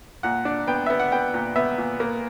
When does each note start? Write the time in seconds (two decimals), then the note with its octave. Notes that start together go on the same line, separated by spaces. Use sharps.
0.23 A#2 F#5
0.45 D4
0.67 B3 G5
0.86 B3 E5
1.00 F#5
1.12 B3 G5
1.34 A#2
1.56 B3 E5
1.78 A#2
2.00 A#3